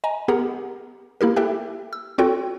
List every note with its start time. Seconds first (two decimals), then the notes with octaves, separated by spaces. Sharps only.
0.04 D#5 G#5 A#5
0.28 B3 G4 G#4 A#4 F#5 A#5
1.21 A#3 E4 G4 A#4
1.36 G4 A4 E5 G5 F#6
1.93 E6
2.18 C4 F4 F#4 A4 C#5 G5